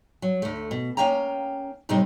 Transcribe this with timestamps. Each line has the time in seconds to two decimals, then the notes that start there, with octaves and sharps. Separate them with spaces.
0.22 F#3
0.42 D2 A3
0.71 B2
0.97 A#3 C#4 F5 G5 A#5
1.89 F#2 A2 C3 G3 C4 D#4